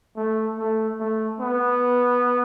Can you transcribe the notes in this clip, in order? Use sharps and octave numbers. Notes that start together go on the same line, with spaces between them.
A3
A3
A3
B3